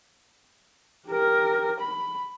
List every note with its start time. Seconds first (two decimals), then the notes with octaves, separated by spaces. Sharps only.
1.08 G4 A#4
1.80 B5